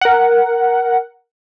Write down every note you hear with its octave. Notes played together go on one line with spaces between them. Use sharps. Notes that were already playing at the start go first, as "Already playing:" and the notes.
A#4 F#5